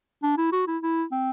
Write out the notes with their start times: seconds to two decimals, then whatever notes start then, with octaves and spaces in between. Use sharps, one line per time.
0.23 D4
0.38 E4
0.52 F#4
0.67 E4
0.83 E4
1.12 C4